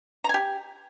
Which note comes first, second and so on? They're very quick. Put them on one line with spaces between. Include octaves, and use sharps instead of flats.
A#5 G#5 G4